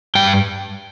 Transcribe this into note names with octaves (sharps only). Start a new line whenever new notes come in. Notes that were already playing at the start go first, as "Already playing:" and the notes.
G2 G5